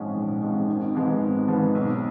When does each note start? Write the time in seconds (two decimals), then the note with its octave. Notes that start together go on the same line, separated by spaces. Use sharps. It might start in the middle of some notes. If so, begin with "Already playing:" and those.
Already playing: A#1 G#2 F3 G#3 C#4
0.16 A#1
0.42 G#2 F3 G#3 C#4
0.68 G#1
0.94 G#2 F3 G#3 B3
1.21 G#1
1.48 G#2 F3 G#3 B3
1.75 B1